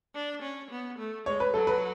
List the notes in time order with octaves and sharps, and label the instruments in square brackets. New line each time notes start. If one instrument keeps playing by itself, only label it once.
[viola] D4
C#4
B3
A3
[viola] G#3 [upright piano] C#5
[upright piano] B4
[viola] F#3 [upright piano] A4
[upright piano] B4